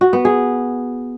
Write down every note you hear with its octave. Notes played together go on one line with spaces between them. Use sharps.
F#4
B3
G#4